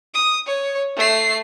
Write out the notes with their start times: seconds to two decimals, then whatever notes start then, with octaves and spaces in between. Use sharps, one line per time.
0.14 D#6
0.46 C#5
0.97 A3 C7